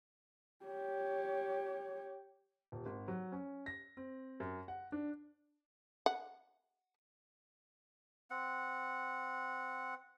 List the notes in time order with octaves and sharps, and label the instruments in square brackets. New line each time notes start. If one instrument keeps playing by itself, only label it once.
[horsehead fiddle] G4 C#5
[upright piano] D#1
G#1
F#3
C#4
A#6
C4
F#2
F#5
D4
[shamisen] F#5
[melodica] C4 F#5